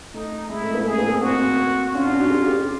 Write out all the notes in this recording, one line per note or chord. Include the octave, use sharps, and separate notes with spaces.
A3 D#4
G#3 E4
A3
A#3
A3 G#4
A#3
C4
C4 F#4
C#4 F4
D4
F#4
G4
G4